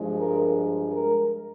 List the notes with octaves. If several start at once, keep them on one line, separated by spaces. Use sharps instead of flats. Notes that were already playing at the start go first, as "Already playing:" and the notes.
Already playing: G2 F3 G#3
A#4
A#4